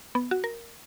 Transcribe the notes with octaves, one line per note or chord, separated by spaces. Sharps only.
B3
F#4
A#4